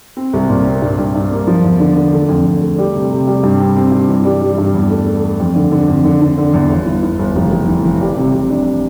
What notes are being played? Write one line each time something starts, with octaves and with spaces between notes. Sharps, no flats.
C4
C2
A#2
C4
G2
G2
G2
A#3
F3
E2
D3
D3
A3
F2
F2
A3
G3
C3
C3
G3
G2
C4
C4
G2
E3
G3
G3
G2
E2
A3
A3
A3
F2
D3
D3
F2
D3
D3
D3
E2
G1
E3
E3
G1
F1
F1
E3
E3
G3
C3
C3
D4